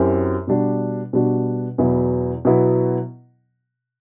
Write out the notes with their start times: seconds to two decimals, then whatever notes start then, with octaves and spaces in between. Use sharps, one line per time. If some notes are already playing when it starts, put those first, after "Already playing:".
Already playing: F#2 F#3 C4 E4 G4
0.47 B2 G3 D4 F#4
1.13 B2 G3 D4 F#4
1.78 E2 B2 F#3 B3 E4
2.45 B2 F#3 B3 E4